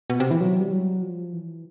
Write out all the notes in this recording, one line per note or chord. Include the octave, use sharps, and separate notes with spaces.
B2
C3
E3
F#3
G3
F#3
F3
E3